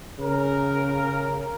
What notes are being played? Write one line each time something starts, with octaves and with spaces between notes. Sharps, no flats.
C#3 A#4